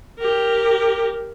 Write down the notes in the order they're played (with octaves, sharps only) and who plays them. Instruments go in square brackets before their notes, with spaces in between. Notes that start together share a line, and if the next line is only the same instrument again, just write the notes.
[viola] G4 A#4